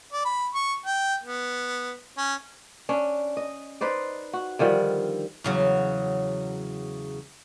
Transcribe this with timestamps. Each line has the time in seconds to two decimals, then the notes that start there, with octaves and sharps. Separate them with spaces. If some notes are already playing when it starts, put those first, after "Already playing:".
0.12 D5
0.25 B5
0.54 C#6
0.86 G5
1.24 B3
2.18 C#4
2.89 C#4 D4
3.37 D#5
3.81 D#4 B4 C5 D5
4.33 F#4
4.59 D3 D#3 F3 G3
5.44 E2 C#3 F#3